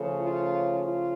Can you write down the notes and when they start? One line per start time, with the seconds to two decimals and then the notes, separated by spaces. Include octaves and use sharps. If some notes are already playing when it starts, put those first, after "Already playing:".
Already playing: C#3 F3 A3 C#4
0.20 F4
0.77 F4